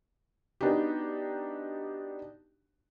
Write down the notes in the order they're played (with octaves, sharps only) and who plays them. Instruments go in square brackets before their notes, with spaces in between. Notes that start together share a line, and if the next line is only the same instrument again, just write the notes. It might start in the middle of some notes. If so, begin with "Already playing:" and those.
[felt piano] B3 D4 D#4 F#4 G4